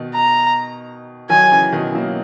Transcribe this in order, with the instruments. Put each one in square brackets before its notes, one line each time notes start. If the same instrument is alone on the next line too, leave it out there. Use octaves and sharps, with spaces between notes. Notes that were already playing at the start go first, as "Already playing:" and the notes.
Already playing: [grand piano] B2 D#3
[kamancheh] A#5
[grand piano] D#3 F#3 [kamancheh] G#5
[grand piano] C#3 E3
B2 D#3
F#3 A#3